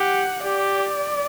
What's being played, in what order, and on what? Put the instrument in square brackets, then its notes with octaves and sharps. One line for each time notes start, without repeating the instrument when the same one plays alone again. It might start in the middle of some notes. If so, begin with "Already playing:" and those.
Already playing: [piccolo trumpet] G4 [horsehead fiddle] F#5
[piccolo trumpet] G4 [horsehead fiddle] D5